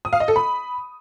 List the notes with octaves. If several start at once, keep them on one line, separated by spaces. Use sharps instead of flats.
D#6
F5
D#5
A4
B5